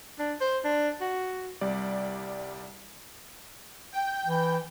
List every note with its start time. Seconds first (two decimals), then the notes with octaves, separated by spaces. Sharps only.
0.19 D4
0.41 C5
0.64 D4
1.01 F#4
1.61 C2 G3 D5
3.93 G5
4.25 E3